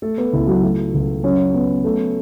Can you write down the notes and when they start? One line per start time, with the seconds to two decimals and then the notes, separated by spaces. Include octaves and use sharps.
0.02 A3 A4
0.18 B3 B4
0.33 C#2 E4
0.47 F#3 F#4
0.62 A3 A4
0.94 C#2
1.24 F#3 C#4 C#5
1.54 B3
1.84 A3